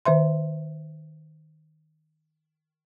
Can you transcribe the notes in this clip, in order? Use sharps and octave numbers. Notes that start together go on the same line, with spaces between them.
D#3 C5 E5 C6